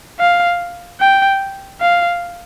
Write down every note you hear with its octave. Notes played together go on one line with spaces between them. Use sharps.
F5
G5
F5